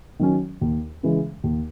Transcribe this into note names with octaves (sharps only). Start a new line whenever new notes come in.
D#3 F#3 C#4
D#2
C#3 E3 G#3
D#2